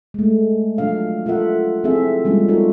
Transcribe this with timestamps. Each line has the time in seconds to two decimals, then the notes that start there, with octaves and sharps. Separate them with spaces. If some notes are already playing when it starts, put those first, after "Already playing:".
0.14 G#3 A3
0.78 F3 F#3 D4 F5
1.26 F4 A4 A#4 E5 F#5
1.84 F3 C4 E4 G#4 A4 E5
2.25 F3 G3 G#3 A#3 C#4 F4
2.48 D#4 F4 F#4 A4 A#4